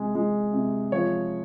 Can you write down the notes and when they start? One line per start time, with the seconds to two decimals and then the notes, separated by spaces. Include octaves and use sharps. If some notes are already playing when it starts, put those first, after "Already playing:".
Already playing: C3 G#3
0.15 G#3
0.53 C3
0.92 F3 C#5